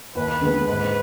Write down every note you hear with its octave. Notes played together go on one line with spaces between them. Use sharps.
D#2 B4
D3 G#3 B3
G#2 B4